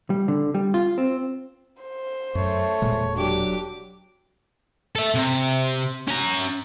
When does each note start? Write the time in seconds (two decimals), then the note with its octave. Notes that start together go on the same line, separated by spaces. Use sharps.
0.10 G3
0.28 D3
0.54 G3
0.74 F4
0.98 C4
1.82 C5
2.35 F#2 A3 C#5
2.82 E1 A#2 G#3
3.16 F#3 D4 G4 D6
4.95 A4 E5
5.14 C3
6.08 C#4 A#5